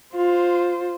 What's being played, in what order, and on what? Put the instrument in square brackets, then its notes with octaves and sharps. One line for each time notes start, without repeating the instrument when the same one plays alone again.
[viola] F4 C5